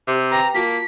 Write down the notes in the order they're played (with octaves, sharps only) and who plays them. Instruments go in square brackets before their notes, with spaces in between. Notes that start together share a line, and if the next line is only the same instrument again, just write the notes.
[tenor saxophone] C3
[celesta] B4 G5 D6 [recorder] A#5
[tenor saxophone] A#3 [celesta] F4 F#4 A5 [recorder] B6